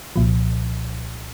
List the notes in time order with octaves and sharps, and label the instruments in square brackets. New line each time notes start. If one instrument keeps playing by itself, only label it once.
[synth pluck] C2 A#2 F3